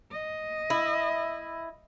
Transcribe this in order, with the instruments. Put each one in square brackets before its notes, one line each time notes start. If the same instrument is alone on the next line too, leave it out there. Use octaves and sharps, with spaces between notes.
[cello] D#5
[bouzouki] E4